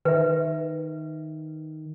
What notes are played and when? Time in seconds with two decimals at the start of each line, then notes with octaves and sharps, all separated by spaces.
0.05 D#3 B4 E5